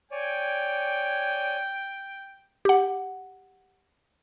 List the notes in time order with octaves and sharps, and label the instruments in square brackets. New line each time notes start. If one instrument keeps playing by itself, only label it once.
[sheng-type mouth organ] C#5 D5 G#5 [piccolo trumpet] G5
[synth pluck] G4 F#5